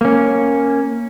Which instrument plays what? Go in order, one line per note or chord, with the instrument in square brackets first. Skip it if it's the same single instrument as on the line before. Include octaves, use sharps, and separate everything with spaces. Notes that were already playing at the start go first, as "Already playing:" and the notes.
[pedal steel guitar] A#3 C#4